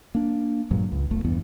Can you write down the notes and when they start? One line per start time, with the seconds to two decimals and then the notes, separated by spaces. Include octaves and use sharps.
0.15 A#3 D4
0.71 G2 A#2 F#3 G#3
0.92 C#2
1.11 E1 B1 A3
1.25 E2 G2 E3 B3